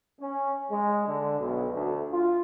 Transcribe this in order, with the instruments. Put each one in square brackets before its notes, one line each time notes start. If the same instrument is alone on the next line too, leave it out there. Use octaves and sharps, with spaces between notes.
[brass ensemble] C#4
G#3
D3
B1
D2
F4